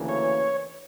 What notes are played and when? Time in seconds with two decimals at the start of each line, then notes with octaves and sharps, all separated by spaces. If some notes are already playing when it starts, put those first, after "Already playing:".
Already playing: D2 C#3 E3 A#3
0.09 C#5